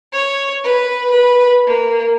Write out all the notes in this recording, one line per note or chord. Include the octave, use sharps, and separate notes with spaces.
C#5
B4
B4
A#3